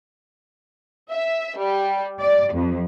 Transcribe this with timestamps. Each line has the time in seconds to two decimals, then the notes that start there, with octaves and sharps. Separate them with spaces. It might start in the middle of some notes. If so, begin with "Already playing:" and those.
1.11 E5
1.58 G3
2.21 D5
2.53 F2